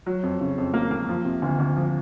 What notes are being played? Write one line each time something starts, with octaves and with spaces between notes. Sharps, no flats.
F#3
F2
C#3
F2
A#3
A#3
F3
C3
D2
D2
F3